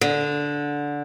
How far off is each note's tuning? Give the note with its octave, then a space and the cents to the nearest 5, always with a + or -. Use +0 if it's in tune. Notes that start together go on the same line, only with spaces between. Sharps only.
D3 -10